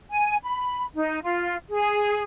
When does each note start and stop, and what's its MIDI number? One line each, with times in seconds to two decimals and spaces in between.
0.11 0.36 80
0.43 0.85 83
0.95 1.18 63
1.23 1.56 65
1.69 2.23 68